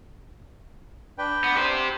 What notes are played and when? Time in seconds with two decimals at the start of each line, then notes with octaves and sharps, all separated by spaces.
1.18 D4 B4 G5
1.44 B3
1.57 G4 C5